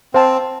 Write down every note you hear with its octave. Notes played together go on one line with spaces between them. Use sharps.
C4 C5 F5 A5